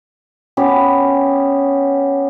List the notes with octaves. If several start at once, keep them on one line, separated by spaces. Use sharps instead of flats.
B3 C#4 G4